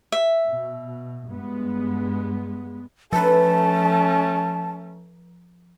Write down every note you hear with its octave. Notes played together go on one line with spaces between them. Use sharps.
E5
B2
G2 G#3 B3
F3 A3 C#4 A4 B4 A5